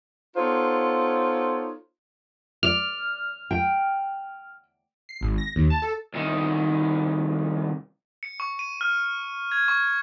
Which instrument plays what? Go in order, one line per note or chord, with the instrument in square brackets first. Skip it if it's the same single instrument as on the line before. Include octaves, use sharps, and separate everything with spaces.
[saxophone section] B3 D#4 F4 A4 C5 C#5
[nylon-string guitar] D5 [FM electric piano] F6
[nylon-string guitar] G5
[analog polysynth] C7
G#1
A#6
D#2
A5
A4
[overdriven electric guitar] C2 D#3
[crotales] C#7
C#6
D#7
F6
G#6
C#6